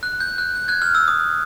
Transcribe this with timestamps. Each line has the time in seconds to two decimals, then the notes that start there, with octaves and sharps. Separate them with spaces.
0.03 F#6
0.20 G6
0.38 F#6
0.55 G6
0.68 F#6 G#6
0.82 F6
0.95 E6
1.08 D#6